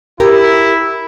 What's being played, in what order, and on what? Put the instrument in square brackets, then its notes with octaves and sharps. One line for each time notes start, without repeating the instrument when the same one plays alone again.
[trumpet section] E4 [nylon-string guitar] G4 A#4